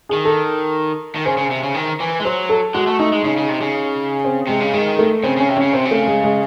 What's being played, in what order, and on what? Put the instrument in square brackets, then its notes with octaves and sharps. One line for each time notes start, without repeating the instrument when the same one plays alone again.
[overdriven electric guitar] D#3 [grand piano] G#4
[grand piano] A4
[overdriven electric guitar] D#3
[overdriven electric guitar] C#3 [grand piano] C5
[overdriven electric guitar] C#3
C3
C#3
D#3
E3
G#3
[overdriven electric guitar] F#3 [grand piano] C5
[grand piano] A4
[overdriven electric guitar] G#3 [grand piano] F#4
[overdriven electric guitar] A3
[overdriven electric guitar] A3 [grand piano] D#4
[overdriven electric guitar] G#3
[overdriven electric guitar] C#3 [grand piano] D#4
[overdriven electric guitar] C#3
C3
C#3
[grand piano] C4
[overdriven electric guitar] C3 [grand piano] G#3
[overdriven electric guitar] C#3
[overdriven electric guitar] D#3 [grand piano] G#3
[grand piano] A3
[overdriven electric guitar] C#3 [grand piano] C4
[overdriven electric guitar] C#3 [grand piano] C#4
[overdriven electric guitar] C3
[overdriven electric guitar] C#3 [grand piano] C#4
[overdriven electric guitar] C3 [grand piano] C4
[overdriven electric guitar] C#3
[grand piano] A3
G#3
G#3